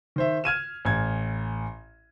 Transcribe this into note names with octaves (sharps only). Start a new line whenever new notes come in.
D#3 C5 E5
F6 G#6 D#7 E7
A1 G#6